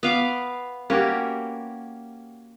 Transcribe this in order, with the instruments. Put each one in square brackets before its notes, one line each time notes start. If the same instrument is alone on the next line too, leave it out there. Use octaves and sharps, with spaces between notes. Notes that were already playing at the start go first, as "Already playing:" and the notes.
[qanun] B3 F5 D6
[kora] A#3 F#4 G4 [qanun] C#4